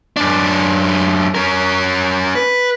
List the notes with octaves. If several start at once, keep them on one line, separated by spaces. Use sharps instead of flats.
F#2 D4
C#4 A#4
B4